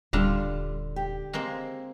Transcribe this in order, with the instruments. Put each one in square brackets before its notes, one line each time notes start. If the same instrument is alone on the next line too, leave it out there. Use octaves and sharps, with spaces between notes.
[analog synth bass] D#1 [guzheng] D3 D4 F4 [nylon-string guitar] G3
[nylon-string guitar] G4
[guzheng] G#3 A#3 C4